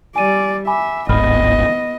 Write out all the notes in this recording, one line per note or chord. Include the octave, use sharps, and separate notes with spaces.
G3 D5 G#5 D#7
E5 G#5 B5 D6
D1 G#1 B3 D#5 B5 D#6 F6